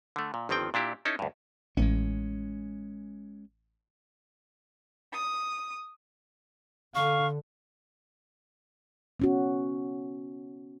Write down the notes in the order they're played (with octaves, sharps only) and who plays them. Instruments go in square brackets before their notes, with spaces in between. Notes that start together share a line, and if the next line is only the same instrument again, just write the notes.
[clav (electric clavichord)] D3 A3
A#2
G1 D#3 F3 C4 G5
A#2 D4 E4 G4
C#4 D#4 E4 A4
D2 G2
[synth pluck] A1 [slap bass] G#3 B3 C#4
[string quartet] D#6
[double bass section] D3 [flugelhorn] F5 [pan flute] C#6
[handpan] B3 C#4 F#4